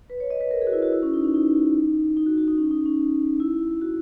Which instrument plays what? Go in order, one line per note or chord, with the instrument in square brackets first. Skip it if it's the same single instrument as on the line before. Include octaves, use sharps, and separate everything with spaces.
[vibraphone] B4
C#5
D#5
B4
A#4
G#4
F#4
E4
F#4
E4
C#4
D#4
C#4
D#4
D#4
F#4
F#4
D#4
C#4
D#4
C#4
E4
F#4